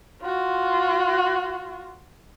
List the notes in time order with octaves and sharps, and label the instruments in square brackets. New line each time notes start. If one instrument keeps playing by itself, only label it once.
[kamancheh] F4 F#4